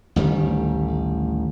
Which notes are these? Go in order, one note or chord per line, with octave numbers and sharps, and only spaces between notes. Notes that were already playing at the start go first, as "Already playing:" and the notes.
A1 D2 D#3 G3